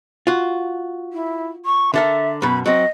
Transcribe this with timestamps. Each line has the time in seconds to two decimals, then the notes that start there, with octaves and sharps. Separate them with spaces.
0.27 F4 F#4
1.13 E4
1.66 C#6
1.94 D3 A4 A#4 E5
2.42 F#2 B2 B5
2.66 F#3 C4 D#5